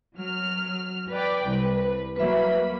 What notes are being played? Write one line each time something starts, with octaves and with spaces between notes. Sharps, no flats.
F#3 F6
B4 D5 G5
C2 B4
F#3 A#3 B4 E5 B5